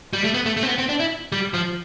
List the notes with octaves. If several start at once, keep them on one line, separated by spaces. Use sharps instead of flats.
G3
A3
B3
A3
A3
C4
B3
C4
D4
E4
G3
F3